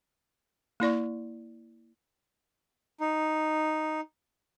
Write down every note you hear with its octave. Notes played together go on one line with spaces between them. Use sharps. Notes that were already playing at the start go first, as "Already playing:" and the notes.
A#3 E4 D5 C#6
D#4